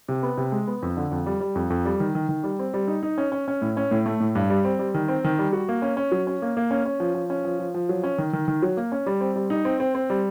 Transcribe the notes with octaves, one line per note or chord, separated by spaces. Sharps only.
C3
B3
C3
G#3
B3
F2
D3
F2
G3
G3
F2
F2
G3
D#3
D#3
D#3
G3
C4
G3
D#4
D#4
C#4
C#4
C#4
A2
C#4
A2
A3
A2
G2
G3
C4
G3
D#3
C4
D#3
G3
F#4
A#3
C#4
C#4
F#3
C#4
A#3
A#3
C#4
C#4
F3
F3
C#4
F3
F3
F3
F#3
C#4
D#3
D#3
D#3
F#3
A#3
C#4
G3
C4
G3
D#4
C4
C4
C4
G3